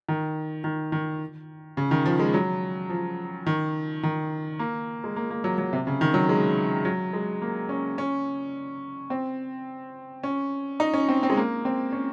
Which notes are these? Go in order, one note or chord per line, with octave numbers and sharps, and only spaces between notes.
D#3
D#3
D#3
C#3
D#3
F3
G#3
F#3
F3
D#3
D#3
A#3
G#3
A#3
A#3
F#3
F#3
C3
C#3
D#3
F#3
G#3
F#3
G#3
A#3
C#4
C#4
C4
C#4
D#4
C#4
C4
C4
G#3
A#3
C4
C#4